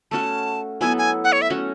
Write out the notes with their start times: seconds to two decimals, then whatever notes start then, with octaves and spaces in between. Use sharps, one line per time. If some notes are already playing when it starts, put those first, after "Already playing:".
0.11 A3 C#4 F#4 A5
0.81 F#3 B3 E4 A4 G#5
0.98 G#5
1.24 F#5
1.32 C#5
1.42 E5
1.50 A3 C#4 F#4